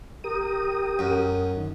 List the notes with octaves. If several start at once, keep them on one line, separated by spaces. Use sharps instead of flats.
G4 A#4 D#6
F#2
D#3